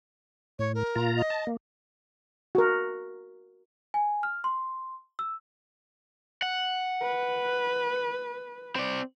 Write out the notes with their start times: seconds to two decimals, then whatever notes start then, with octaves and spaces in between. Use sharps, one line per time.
0.59 A2 C#5
0.75 A#4
0.95 A#2 F4 A#5
1.16 D#5
1.30 A5
1.47 A#3
2.55 F#4 A#4
3.94 G#5
4.23 F6
4.44 C6
5.19 E6
6.42 F#5
7.03 B4
8.76 C4 D5